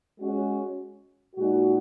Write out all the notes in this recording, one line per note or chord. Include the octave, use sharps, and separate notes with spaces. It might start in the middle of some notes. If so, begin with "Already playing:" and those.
G#3 C#4 F#4
A#2 G#3 D#4 F#4